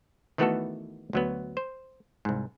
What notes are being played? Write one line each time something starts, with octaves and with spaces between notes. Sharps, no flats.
D#3 E3 A3 B3 F#4 A4
D2 F#3 B3
C5
C2 G#2